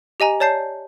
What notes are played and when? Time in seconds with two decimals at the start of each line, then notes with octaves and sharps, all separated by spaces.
0.20 G4 D#5 G#5 A#5
0.40 C#5 D5 A5 G6 C7